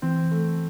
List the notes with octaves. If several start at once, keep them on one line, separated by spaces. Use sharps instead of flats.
E3 C4
A3